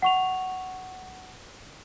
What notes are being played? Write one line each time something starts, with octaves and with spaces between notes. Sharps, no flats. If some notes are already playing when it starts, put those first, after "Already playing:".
F#5 C#6 F7